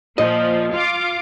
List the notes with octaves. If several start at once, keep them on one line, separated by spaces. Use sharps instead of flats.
A#2 F3 D#5
F4 F5 D6